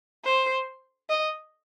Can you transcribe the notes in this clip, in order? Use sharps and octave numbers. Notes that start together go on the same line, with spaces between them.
C5
D#5